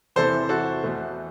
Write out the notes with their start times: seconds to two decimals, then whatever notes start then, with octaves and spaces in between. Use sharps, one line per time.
0.16 E2 C3 E3 A4 C5
0.49 F#4 A4
0.84 E2 B2 A3